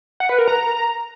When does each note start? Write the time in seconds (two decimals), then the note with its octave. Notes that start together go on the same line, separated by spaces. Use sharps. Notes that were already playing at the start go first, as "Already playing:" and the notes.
0.20 F#5
0.29 B4
0.38 A#4
0.48 A#5